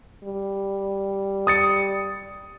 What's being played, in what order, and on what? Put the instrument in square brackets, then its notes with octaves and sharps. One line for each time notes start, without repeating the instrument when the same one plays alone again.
[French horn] G3
[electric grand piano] D#6 A6 C#7